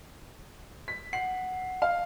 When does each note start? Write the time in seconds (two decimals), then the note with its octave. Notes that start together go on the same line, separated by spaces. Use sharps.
0.88 B6
1.13 F#5 C7
1.82 F5